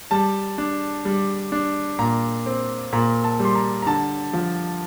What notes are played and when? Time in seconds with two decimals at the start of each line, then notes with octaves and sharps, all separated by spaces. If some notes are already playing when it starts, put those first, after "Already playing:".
0.11 G3 A5
0.58 D4
1.05 G3
1.52 D4
1.99 A#2 A#5
2.46 C4
2.93 A#2 A#5
3.24 A5
3.40 G3
3.45 C6
3.55 A#5
3.82 A#5
3.87 D3 A5
4.33 F3